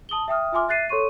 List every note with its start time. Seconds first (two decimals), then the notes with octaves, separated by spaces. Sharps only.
0.09 A5 D#6 F#7 G7
0.28 E5 G5 D#6 F6
0.52 F4 E5 G#5 C6 D6 F6
0.69 E5 F#6 A6 C7 D#7
0.89 A4 C#5 C6 C#6 D#7